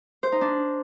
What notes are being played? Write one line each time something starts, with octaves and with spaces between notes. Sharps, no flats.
C5
D#4
D4